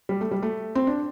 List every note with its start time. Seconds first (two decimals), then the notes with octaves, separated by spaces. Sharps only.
0.09 G3
0.21 A3
0.31 G3
0.43 A3
0.75 C4
0.87 D4